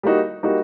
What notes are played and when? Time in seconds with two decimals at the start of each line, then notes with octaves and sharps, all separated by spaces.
0.03 G3 A#3 D#4 F#4
0.43 G3 A#3 D#4 F#4